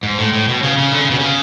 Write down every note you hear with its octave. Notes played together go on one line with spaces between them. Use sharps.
G#2
A2
A2
B2
C#3
C#3
D3
C#3
B2
C#3